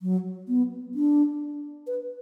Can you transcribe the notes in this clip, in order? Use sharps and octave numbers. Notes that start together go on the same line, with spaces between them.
F#3
B3
D4
B4